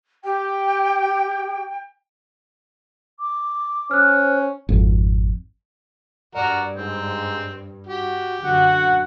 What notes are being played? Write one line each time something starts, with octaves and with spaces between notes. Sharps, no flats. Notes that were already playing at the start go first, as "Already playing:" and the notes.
G4 G5
D6
C#4 C5 F6 F#6
G#1 F2
G2 F#4 A#4 D5
G#2 C4
F#4 G4
F#2 D3 F#4 F#5